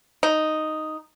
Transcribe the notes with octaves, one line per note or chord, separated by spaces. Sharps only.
D#4